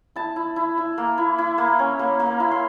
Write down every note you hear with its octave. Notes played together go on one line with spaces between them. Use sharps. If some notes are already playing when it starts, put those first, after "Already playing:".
E4 A5
E4
E4
E4
A#3
E4
E4
A#3
C#4
A#3
A#3
E4
C6